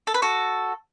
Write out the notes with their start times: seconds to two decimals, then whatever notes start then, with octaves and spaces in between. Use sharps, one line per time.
0.07 A4
0.14 B4
0.22 F#4 A4